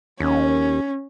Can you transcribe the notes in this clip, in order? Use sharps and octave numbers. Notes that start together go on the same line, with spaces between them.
D#2 C#4